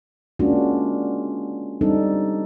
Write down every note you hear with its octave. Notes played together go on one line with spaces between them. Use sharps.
G#3 A#3 C#4 D4 F4 F#4
G3 C4 D4 D#4 A4